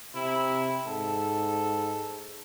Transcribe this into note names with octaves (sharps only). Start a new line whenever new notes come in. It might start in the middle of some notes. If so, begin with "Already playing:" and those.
C3 E4
G#2 A4